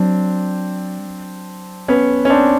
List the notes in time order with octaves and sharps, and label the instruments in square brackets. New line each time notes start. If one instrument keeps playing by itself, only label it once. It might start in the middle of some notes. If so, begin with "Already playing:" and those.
Already playing: [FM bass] F#3 [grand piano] C4 D4
[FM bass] G3
F#3
[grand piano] B3 C#4
C#4
C4 D4